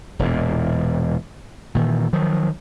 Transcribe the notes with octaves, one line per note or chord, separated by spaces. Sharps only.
E1 E2 A#2
A#2 D#3 E3
D#3 F3 F#3